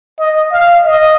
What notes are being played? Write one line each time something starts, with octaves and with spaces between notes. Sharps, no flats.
D#5
F5
D#5